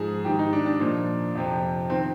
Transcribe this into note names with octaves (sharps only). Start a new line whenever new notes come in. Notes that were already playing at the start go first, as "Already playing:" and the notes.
Already playing: G#2 F3 G#4
G#2 D#3 G4
D#4
D4
D4
A#2 F3
F2 C3 F3
D#3 C4